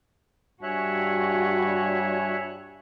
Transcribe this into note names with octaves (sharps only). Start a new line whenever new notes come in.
G2 F#4 C#5 E5 G#5 F#6